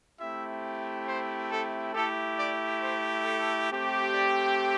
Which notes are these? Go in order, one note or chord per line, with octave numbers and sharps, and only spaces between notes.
A3 C4 E4 G4 E5
C5
A4
A3 E4 G4 A4
D5
C5
A4
A3 C4 G4
D5